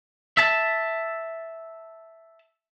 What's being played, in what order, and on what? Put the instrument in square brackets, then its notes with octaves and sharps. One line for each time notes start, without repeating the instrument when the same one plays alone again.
[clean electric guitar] E5 A5